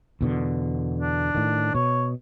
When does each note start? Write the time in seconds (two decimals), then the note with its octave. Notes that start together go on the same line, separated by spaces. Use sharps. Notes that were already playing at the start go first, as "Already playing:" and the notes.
0.21 E2 B2 D3
1.00 D4
1.35 A2 D#3
1.75 B2 C#5